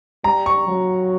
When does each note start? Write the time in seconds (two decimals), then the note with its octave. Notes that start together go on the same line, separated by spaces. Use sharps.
0.24 G3 A#5
0.46 C#6
0.68 F#3